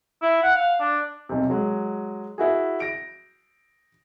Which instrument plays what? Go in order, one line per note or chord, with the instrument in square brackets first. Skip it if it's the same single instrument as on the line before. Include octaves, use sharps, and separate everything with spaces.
[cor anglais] E4
F#5
F5
D4
[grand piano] B1 C3
F#3 G#3
E4 F#4 G#4
A#6 D7